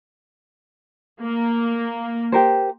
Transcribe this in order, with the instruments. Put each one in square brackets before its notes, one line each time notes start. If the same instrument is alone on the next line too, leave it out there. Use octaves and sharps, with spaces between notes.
[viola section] A#3
[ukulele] G4 A#4 C5